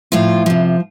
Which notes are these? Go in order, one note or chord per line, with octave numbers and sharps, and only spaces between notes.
A2 F3 F4
C3 F3